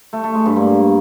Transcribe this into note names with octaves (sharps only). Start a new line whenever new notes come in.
A3
A3
G#3
G2
A#3